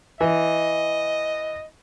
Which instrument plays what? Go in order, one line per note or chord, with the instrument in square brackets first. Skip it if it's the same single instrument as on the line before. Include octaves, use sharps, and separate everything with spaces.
[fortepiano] E3 [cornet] D#5